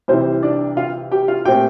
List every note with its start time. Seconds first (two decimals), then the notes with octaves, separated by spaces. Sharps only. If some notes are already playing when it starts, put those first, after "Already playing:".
0.08 C2 C3 E3 C4 C5
0.43 D4 D5
0.77 F4 F5
1.12 G4 G5
1.28 F4 F5
1.45 A#2 A3 C4 G4 G5